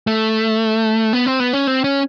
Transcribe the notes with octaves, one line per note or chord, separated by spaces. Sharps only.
A3
B3
C4
B3
C#4
C4
C#4